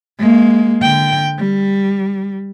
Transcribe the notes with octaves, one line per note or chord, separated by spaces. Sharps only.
G#3 A#3
D3 G5
G3